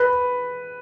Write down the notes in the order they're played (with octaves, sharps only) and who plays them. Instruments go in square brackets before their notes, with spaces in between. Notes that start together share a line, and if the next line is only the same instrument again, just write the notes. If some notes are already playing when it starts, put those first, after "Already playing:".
Already playing: [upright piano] B4